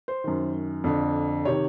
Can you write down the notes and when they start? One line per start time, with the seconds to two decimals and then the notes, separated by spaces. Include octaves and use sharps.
0.08 C5
0.24 F#2 D#3
0.84 F2 D3
1.45 C3 D#3 C#5